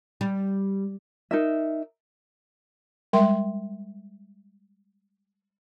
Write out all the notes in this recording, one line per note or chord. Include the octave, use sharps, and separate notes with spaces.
G3
D#4 A#4 E5
G3 G#3 A#4 E5 G5 C6